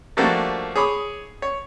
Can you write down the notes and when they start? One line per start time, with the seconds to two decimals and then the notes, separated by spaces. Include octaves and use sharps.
0.17 F3 G3 A3 A#3 D4 F#4
0.76 G#4 C#5 B5 D6 D#6
1.42 C#5